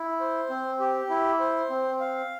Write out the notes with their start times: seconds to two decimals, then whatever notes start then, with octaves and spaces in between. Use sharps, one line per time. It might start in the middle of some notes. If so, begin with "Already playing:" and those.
Already playing: E4
0.20 C5
0.50 C4
0.79 G4
1.10 E4
1.40 C5
1.70 C4
2.00 F5